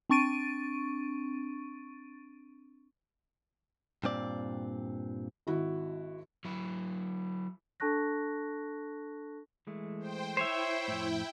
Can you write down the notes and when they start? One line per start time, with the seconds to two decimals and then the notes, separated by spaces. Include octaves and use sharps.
0.10 C4 D4 C#6 A6 D7 D#7
4.04 G2 A#2 C4 D5
5.47 G#1 E4 F#4
6.45 F#3 E4
7.80 D4 A4 A5 C#6 F#6 A#6
9.67 E3 G#3 A3
10.00 C5 G5
10.37 E4 C5 C#5 E5 G5
10.88 F2 A2